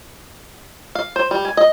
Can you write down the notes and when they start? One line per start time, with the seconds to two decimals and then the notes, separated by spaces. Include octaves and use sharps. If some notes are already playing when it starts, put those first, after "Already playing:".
0.95 F5
1.16 C5
1.31 G3
1.45 G#5
1.57 D#5